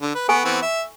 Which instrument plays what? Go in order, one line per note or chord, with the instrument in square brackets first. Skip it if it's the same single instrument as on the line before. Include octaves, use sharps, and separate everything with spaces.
[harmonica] D3
B4
[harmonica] B3 [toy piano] A4 G#5 C#6
[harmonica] E3 B3 C4
E5